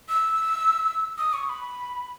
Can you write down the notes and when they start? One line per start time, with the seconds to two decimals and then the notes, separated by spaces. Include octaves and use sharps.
0.09 E6
1.18 D#6
1.33 C#6
1.49 B5